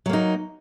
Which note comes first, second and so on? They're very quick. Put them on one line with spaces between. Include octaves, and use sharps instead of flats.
F#3 A#3 D#4